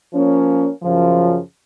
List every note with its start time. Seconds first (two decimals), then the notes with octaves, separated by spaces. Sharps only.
0.12 F3 A#3 C#4
0.82 F#2 C#3 F3